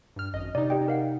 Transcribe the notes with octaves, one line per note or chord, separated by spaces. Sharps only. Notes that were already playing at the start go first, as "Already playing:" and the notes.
G2 F6
G#1 F#2 D#5
C3 D#4 D5
G4 D#5 G5
A#4 F5 F#5